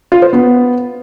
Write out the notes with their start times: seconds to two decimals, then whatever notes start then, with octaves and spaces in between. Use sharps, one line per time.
0.12 F4
0.22 C5
0.33 B3